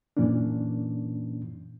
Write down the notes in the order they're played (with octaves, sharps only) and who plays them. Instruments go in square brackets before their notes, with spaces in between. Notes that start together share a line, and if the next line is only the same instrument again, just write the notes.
[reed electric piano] F#2 A#2 E3 A#3 C#4 D4